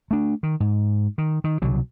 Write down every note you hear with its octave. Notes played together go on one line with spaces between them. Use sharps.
A3 D4
D#3
G#2
D#3
D#3
C2 B2 D3 F#3